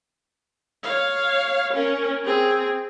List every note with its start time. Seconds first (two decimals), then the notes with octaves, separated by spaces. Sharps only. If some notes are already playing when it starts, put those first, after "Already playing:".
0.83 C#5 F5
1.73 C#4 A#4
2.24 C4 G#4